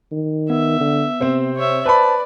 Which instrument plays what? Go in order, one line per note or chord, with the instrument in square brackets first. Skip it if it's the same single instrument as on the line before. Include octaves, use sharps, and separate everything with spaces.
[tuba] D#3
[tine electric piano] B3 [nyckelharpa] E5
[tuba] D3
[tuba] C3 [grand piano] C4 C5
[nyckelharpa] C#5 E5
[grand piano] B4 B5 [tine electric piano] C5 A5 [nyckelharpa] D5